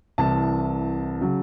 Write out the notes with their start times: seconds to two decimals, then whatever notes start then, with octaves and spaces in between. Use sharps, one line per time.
0.18 C2 C3 E3 A5
1.21 C#3 F#3